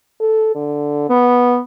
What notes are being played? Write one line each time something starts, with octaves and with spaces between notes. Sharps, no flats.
A4
D3
B3